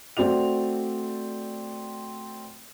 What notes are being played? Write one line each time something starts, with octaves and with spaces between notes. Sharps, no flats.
A3 C4 F#4 D5 F7